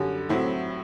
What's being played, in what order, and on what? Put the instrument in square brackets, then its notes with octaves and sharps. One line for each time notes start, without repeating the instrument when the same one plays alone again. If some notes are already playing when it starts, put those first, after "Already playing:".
Already playing: [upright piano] F#2 D3 G3
A2 F#3 C4 E4